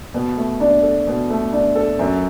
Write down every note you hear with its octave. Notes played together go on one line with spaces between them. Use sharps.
B2
A3
D4
A4
B2
A3
D4
A4
F#2